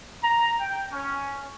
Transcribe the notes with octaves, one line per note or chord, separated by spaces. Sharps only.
A#5
G5
C#4